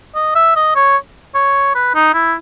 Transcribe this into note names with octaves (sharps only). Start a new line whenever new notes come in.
D#5
E5
D#5
C#5
C#5
B4
D#4
E4